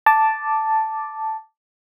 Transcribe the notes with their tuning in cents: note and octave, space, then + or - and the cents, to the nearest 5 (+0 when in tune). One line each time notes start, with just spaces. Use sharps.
A5 +0 D6 +0